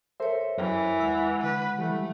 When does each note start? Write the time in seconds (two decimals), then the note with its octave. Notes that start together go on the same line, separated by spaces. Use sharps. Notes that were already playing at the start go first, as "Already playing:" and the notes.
0.20 A4 A#4 C5 C#5 E5
0.58 F#2 E3
1.00 D#2 G#3 F#5 E6
1.43 D3 B4
1.79 E3 G3 A3